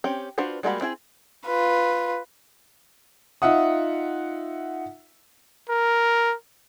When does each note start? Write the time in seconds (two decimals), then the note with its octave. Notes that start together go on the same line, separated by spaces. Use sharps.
0.04 C4 C#4 G4
0.38 D4 F4 F#4 B4 C5
0.63 G3 G#3 A#3 F#4 B5
0.81 C4 E4 G#4
1.46 F4 B4
3.42 D#4 F4 E5 F#5 D#6
5.70 A#4